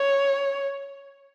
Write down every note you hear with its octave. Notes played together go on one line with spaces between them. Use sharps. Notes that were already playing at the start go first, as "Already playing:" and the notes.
Already playing: C#5